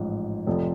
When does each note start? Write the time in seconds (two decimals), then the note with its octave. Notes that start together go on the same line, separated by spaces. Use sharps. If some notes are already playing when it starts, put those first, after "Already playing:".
Already playing: A1 G#2 F3
0.46 F1 F2 F3